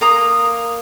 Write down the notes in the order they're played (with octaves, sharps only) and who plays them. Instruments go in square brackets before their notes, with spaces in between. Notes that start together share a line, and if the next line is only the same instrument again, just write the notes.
[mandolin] A#3 A#5 D#6